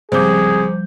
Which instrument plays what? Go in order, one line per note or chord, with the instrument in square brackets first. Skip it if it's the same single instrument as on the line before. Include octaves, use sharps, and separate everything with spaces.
[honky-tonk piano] C#2 C3 G6 [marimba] F3 G3 [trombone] G#4 [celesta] C5 D6